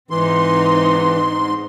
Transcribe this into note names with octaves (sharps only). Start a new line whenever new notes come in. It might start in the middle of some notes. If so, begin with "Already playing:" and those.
G#2 E3 C4 D#4 C6